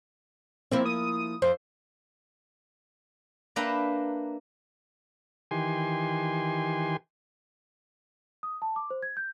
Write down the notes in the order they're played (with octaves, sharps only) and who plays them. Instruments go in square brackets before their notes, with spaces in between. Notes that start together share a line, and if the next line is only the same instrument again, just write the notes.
[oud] F3 A#3 E4 [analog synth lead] C4
[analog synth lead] D#6
[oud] F2 [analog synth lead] C5
[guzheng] A#3 D4 B4 E5 G5 A#5
[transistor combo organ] D#3 E3 G4 G#5 C6
[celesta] D#6
A5
D6
C5
G#6
G6